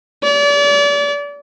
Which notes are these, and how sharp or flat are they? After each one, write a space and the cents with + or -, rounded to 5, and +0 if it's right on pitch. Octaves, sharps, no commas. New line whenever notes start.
D5 -35